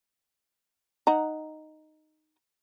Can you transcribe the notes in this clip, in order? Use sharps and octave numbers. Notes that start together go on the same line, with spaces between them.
D#4 F#5 A#5